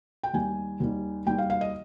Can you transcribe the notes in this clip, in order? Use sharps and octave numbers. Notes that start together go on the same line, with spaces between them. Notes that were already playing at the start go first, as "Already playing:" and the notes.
G5
D#2 D#3 G3 G#5
D#2 D#3 G3
D#2 D#3 G3 G5
F5
F5
D#5